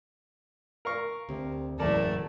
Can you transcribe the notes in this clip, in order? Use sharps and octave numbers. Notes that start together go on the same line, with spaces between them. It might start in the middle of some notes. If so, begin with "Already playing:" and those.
A#4 F5 C#6
D2 C3
F#1 E2 A2 E3 A3 A#4 D5 A5